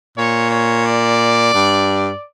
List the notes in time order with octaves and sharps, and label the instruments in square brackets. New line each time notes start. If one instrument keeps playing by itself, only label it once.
[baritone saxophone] A#2 [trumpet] C#5
[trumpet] C#5
D5
[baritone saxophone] G2